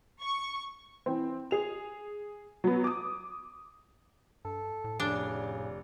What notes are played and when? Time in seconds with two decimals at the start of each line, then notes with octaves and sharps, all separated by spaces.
0.20 C#6
1.06 E3 C4
1.51 G#4 F7
2.64 F#3 B3
2.84 D6 D#6
4.45 G2 A4
4.84 A2
5.00 F1 C#3 D4 G7